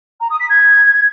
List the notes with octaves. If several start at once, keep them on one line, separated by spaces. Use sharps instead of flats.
A#5
D#6
B6
G#6